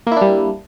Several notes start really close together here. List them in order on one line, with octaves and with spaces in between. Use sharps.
A#3 E4 D4 G3